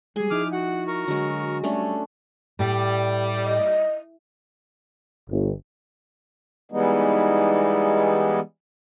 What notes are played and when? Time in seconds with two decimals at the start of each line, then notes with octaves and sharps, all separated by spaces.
0.16 G3 G#3 G#4 G#5
0.31 F3 D#4 E4 D6 F6
0.52 F#4 F#5
0.87 A#4 A#5 C#6
1.08 D3 F#3 G#3
1.64 G3 A3 C#4 D4 A4
2.59 A2 G3
3.44 D#5
5.30 G1
6.72 E3 G3 G#3 B3 D#4